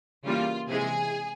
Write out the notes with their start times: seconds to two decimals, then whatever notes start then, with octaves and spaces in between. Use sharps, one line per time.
0.25 C#3 E3 G3 A#3 F4
0.68 C3 E3 G#3 G#4